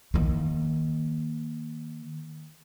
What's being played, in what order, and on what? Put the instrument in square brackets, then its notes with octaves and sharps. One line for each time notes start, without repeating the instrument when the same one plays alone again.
[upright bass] D#3 A#3